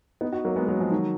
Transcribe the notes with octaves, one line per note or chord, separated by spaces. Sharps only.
B3 D#4
D#4 F#4
F#3 A#3
G#3 B3
F#3 A#3
F3 G#3
D#3 F#3